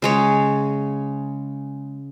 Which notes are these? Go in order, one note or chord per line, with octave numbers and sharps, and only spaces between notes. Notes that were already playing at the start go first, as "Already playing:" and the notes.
C#3 G#3 C#5